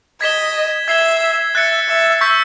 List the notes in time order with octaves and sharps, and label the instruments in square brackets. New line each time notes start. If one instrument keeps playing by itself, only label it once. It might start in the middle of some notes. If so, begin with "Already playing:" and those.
[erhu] D#5 [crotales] G#6 B6 E7 G7
[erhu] E5 [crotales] G#6 C7 E7 G7
[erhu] E5 [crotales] F#6 A6 C#7
[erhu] E5
[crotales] C#6 E6 G6 B6